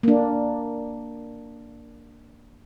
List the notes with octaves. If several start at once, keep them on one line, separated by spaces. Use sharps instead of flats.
A#3 D4